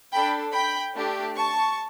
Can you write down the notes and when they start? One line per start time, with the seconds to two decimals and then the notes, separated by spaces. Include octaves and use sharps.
0.13 D4 A4 G5 B5
0.54 G5 B5
0.96 A3 D4 G4
1.37 A5 C#6